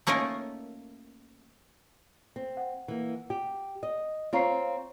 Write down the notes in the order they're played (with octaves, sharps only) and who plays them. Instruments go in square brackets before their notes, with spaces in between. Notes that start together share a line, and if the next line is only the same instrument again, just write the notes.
[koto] A3 A#3 C#4 D#4 F4 A#4
[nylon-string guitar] C4
[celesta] F#5
[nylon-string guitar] E3 A#3
G4
D#5
[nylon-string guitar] C4 F4 C#5 [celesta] F5 A#5 C7